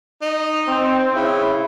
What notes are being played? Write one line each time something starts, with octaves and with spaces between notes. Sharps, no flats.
D#4
C4
C#3 E4